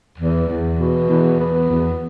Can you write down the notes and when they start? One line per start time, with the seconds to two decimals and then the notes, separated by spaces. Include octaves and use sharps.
0.19 E2
0.49 E2
0.79 B2
1.10 E2
1.40 B3
1.71 E2